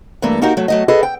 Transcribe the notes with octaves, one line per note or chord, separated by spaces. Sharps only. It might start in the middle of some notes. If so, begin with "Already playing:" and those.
G2 E3 A3 A#3
A#3 D#4 F#4 G4 A#4
F#3 A3
F#3 A3 D#5
G#4 A4 B4 D#5
G5